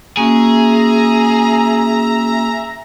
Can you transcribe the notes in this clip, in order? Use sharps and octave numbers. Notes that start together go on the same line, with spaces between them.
A#3 C#4 F#4 G#4 E5 A#5